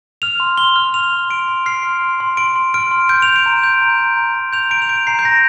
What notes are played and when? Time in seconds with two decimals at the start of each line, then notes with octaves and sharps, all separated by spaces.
0.22 F6 F7
0.40 C6
0.57 C6 G7
0.76 F6
0.94 C6 F7
1.13 C6
1.30 C6 D7
1.48 C6
1.66 F6 C7
1.83 C6
2.02 C6
2.20 C6
2.37 C6 D7
2.56 C6
2.74 F6 D7
2.91 C6
3.09 G6 D7
3.22 F7
3.28 G6
3.36 D7
3.46 A#5
3.63 G6
3.82 A#5
4.00 A#5
4.17 A#5
4.35 A#5
4.53 G6 F7
4.70 A#5 D7
4.82 F7
4.89 G6 D7
5.07 A#5 C7
5.19 G6
5.24 A#5 A#6